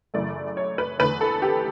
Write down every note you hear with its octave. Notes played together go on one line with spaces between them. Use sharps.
F#2 C#3 E3 A3 D5
C#5
B4
E2 D3 A3 B4
A4
G4